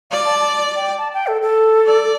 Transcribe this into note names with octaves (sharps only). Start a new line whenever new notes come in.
D5 F5
A5
A5
G5
A5
G5
A4
A4
D5